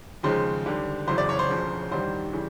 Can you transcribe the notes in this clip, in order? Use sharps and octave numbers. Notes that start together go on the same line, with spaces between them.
D#2 C#3 F3 G#3 C5
D#2 D3 G3
F#1 E2 C#3 F#3 C5
D5
C#5
C5
E1 D2 C#3 F3
A1 G2 D#3 G3 C5
C#3 E3 G3